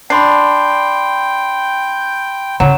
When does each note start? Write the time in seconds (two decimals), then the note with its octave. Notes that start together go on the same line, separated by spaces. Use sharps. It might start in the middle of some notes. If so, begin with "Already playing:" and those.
0.10 D4 G5 B5 C6 C7
2.60 C#3 F#3 E7